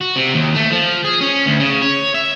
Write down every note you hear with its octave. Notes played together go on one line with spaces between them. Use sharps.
F#4
C3
D#2
A3
F3
G#4
C#4
D2
C#3
C#5
E5